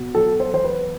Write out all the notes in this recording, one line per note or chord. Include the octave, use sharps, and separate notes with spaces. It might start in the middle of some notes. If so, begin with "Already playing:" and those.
Already playing: B2
F#3 A4
C5
E2 C5
B4